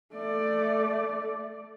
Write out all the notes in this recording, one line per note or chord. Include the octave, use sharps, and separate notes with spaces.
A3 D5